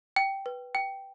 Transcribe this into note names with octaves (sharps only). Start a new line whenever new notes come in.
G5
B4
G5